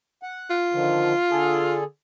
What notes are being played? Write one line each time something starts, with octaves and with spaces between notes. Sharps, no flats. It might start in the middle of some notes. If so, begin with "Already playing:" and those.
F#5
F4
D3 D#3 F3
D3 G#4 A4